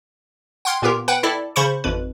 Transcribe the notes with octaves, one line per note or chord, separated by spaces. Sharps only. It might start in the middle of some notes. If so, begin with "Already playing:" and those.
F#5 G5 C6 F6 G#6
A#2 B3 F4 G4 A#4
B4 F#5 G5 F#6
E4 A4 D5
C#3 C5 B5 C#6 C#7
G#1 F2 B4